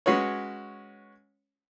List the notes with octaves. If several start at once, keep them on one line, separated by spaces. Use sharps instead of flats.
G#3 C#4 F#4 B4 C#5